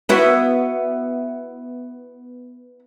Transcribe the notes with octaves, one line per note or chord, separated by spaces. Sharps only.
B3 E4 F#4